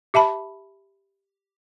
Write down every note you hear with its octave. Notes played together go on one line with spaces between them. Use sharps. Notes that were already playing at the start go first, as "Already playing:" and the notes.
G4 E5 A5 B5